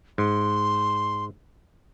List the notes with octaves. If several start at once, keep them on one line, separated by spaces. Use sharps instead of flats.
G#2 C6